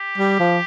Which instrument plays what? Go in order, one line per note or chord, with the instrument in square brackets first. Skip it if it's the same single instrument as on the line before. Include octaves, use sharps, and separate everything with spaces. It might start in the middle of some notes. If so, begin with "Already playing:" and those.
Already playing: [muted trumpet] G4
[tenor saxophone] G3
F3